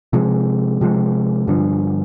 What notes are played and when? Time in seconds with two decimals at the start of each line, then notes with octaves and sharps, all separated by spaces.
0.13 C3 F3 G#3
0.81 C3 F3 G#3
1.47 G2 D3 F3